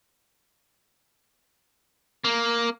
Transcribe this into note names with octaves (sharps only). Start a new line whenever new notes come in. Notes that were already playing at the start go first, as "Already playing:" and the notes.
A#3